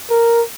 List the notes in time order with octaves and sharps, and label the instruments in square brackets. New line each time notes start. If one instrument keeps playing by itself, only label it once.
[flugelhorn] A#4